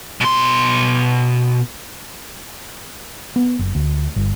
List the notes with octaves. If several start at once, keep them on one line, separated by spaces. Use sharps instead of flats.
B2 C6
B3
F#1
D2
G1